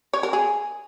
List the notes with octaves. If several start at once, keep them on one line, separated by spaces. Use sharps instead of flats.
C#5
A#4
G#4